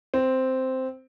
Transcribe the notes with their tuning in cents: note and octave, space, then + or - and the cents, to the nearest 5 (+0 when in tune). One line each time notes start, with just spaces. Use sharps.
C4 -5